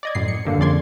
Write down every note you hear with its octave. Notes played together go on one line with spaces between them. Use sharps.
D5 D#5 G#6
F#2 A2 C7
C#7
G2 D3 A#3
F2 C#3 D5 C6 G#6